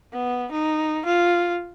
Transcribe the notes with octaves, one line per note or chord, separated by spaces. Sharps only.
B3
D#4
F4